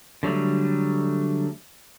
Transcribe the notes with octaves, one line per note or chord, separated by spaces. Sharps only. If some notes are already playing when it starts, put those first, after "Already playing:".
D3 F#3 G3 A3